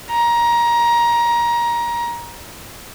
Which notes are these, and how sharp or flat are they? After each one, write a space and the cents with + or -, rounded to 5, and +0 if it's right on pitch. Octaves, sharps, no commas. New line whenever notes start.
A#5 +20